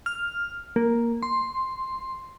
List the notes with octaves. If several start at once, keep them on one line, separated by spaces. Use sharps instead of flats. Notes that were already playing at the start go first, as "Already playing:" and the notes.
F6
A#3
C6